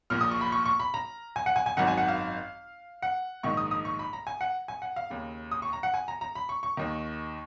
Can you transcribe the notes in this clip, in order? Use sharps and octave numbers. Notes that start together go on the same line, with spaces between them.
A#1 A#2 F6
D#6
C#6
B5
C#6
C#6
B5
A#5
G#5
F#5
G#5
G#5
G#1 F#2 D#3 F#5
G#5
F#5
F5
F#5
A#1 G#2 D#3 C#6
D#6
D#6
C#6
B5
A#5
G#5
F#5
G#5
F#5
F5
D#2 C#3
D#6
C#6
A#5
F#5
G#5
A#5
A#5
B5
C#6
C#6
D#2 D#3